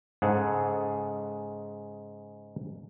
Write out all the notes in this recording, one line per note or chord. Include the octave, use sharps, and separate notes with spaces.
G#2 C#3 G#4 A4 F#5